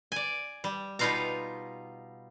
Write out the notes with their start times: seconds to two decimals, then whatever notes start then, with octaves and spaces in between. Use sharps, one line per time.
0.12 D5 G#5
0.64 G3
0.99 B2 G3 D#4 F4 F5 A#5